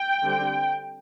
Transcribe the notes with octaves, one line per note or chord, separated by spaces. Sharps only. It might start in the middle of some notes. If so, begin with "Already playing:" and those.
Already playing: G5
D3 G3 C4